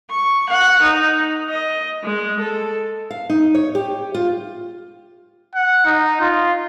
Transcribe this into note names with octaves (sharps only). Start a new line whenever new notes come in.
C#6
F#5
D#4
D#5
G#3
A4
F5
D#4
C#5
G4
F4
F#5
D#4
F4